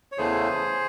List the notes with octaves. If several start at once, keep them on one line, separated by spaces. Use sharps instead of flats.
C#5
E2 C#3 E3 A3 G#4 C5